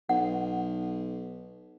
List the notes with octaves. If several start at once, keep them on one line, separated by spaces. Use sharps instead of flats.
B1 F#5